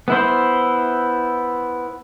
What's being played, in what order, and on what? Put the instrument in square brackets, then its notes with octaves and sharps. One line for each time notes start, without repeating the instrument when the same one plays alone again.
[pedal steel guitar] B3 E4 C5